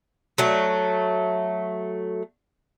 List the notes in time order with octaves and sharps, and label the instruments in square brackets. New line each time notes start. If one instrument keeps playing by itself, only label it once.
[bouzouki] F#3 A3